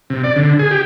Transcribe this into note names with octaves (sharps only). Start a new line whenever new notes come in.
C3
D5
D3
G#4
G4